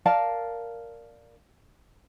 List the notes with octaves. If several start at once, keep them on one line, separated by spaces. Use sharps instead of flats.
A#4 D5 F5 A5